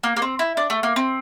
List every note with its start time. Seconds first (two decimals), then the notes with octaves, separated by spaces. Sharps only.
0.03 A#3
0.16 A#3
0.22 C4
0.39 E4
0.57 D4
0.70 A3
0.83 A#3
0.96 C4